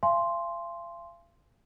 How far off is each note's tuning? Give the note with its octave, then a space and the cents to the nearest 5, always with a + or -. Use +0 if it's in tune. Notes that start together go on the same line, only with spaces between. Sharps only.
F5 -40 G#5 +5 C6 +0